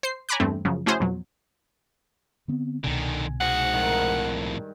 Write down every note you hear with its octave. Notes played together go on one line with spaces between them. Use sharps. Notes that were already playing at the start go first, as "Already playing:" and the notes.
C5 C7
C#5 G#5 A#5 B5 D6 F#6
E2 G2 A3 C4
F#2 C#3 F3
A3 C#4 E4 F#4 G#4 C5
F2 B2 F#3
D3 B3 C4
C2 B2 D3 D#3 G#5
G#2 F#4 G#4 F#5
F2 A2 D#3
G2